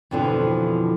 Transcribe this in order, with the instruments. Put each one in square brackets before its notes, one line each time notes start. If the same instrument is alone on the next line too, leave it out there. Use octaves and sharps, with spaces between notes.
[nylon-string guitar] F2 B2 D3 E3 F3